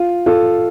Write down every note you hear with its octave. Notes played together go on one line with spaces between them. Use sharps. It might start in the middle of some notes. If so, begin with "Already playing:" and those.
Already playing: F4
F4 A4